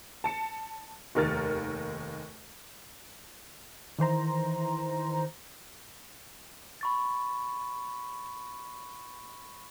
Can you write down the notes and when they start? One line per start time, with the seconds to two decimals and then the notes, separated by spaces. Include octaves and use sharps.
0.24 A5 C#7
1.15 F1 D#2 A#4 F6 A6
3.99 D#3 E3 C5 A#5
6.81 B5 C#6 A6